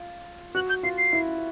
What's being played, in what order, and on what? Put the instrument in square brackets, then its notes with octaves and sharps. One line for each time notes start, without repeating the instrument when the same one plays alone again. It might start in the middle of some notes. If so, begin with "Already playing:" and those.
Already playing: [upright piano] F4
[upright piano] F#4 [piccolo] F#6
[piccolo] G6
[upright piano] F4 [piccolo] C7
[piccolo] C7
[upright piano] E4